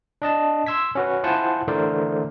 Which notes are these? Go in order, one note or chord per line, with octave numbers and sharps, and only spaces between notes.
D4 D#5 A5
C6 E6 G#6 B6
C#4 F#4 B4
E4 F4 C5 F#5 G#5 A5
D3 E3 A3 A#4 C5 D5